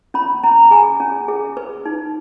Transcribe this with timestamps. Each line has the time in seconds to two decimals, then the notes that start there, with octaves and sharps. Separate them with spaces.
0.14 C#4 B5
0.43 C#4 A#5
0.71 G#4 G#5
1.00 C#4
1.28 G#4
1.57 B4
1.85 D#4